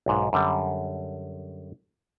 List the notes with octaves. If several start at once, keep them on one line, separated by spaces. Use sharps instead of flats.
B1 G#2
F#2 D3 G3